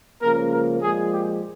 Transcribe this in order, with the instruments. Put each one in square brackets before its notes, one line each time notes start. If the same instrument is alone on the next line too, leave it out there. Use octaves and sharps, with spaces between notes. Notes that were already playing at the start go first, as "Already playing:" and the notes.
[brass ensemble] C#2 C#3 F3 A#3 A#4
A#4
A#2 F3 G#3 G#4
G4